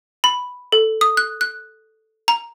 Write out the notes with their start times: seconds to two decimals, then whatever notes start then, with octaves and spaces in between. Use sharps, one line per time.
0.24 B5
0.72 A4
1.01 D#6
1.17 F#6
1.41 F#6
2.28 A#5